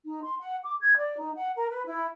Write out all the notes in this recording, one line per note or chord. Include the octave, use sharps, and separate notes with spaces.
D#4
C6
F#5
D6
G#6
D5
D#4
F#5
A#4
B4
E4